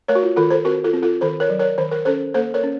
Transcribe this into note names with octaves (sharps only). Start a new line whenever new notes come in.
A3 A#4 C#5
F#4
F4
D#3 F4 A4
A4 C5
C4 F#4 A#4
F4 A4
C4
F4 A4
D#3 A4 C5
A#4 C#5
F#3
A#4 C#5
D#3 C5
A#4
C#4 A4 C5
A#3 A4 C5
A#4 C#5
C#4